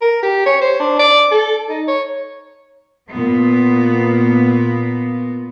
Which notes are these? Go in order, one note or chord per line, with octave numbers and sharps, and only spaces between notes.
A#4
G4
C#5
C5
D4
D5
A4
D#4
C#5
A#2 B3